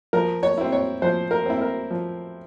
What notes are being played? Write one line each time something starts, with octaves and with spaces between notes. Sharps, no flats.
F3 A#4
C#5
C4 E4
C#5
F3 C5
A#4
C4 E4
A#4
F3